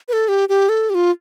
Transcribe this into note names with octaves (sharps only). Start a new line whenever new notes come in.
B4
A4
G4
G4
A4
G4
F4